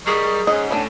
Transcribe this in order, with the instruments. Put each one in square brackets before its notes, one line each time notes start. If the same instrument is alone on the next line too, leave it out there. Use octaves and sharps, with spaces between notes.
[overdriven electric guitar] G3 [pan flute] G#4 [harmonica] A#4 D#5 C#6
[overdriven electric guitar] G#2 [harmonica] C#4 [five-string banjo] D#5
[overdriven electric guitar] A2 [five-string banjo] B3 D4